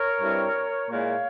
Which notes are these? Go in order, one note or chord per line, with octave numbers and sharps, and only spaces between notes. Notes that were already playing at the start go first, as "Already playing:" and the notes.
Already playing: A#4 C#5
G2 G3 C4 E4
A#2 G#3 E4 C#5 F5